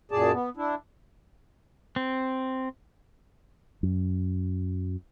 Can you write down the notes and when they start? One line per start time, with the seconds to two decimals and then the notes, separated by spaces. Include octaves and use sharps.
0.11 F#2 A#2 G#4 D5 A5
0.32 B3
0.57 D4 E4
1.96 C4
3.83 F#2